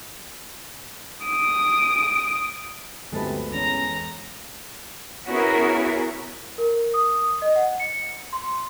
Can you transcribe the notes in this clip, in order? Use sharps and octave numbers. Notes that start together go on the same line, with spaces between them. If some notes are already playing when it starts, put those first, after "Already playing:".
D#6 D7
G1 D2 C3 G#3 A4 B4
E2 C#4 A#5
B3 C#4 E4 F#4 G#4 A#4
A#4
D#6
D#5
F#5
C#7
C6